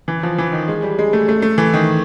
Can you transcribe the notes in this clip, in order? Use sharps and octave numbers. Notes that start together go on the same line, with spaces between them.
E3
F3
E3
D#3
G#3
G3
G#3
A3
A3
A3
E3
D#3